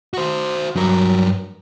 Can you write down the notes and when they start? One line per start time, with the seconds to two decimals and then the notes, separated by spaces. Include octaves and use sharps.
0.14 F#4 C5
0.76 G2 F#3 A#4